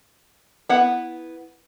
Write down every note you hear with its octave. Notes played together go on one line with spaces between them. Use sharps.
B3 E4 F#5